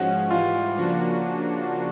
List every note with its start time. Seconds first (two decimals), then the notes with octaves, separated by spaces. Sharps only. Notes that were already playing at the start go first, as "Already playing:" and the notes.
Already playing: G#2 F3 G#3 C#4 F#4
0.30 G#2 E3 G3 F4
0.76 C#3 F3 A#3 D4 F#4